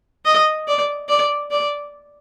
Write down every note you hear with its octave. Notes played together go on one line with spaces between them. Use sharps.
D#5
D5
D5
D5